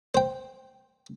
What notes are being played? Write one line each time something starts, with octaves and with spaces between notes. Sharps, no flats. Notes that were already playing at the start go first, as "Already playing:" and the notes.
C5 G5